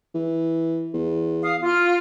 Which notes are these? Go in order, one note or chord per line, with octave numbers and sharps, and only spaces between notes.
E3
E2
F5 D#6
F4 F6